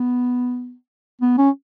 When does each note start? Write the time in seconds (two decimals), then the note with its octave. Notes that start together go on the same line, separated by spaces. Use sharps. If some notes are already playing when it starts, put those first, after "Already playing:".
Already playing: B3
1.21 B3
1.38 C#4